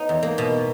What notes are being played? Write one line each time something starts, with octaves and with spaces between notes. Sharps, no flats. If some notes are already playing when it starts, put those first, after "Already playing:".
Already playing: B3 D#4
E2
A#3
B2